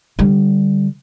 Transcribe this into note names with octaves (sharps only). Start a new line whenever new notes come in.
D3 G3